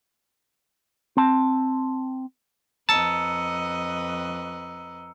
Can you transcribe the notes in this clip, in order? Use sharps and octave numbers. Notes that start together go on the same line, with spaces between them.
C4 A5
F2 B4 D#5 A5 A#5 E6 C#7